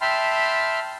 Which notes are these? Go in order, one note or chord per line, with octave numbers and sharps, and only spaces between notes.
E5 G5 A5 B5 C6 F6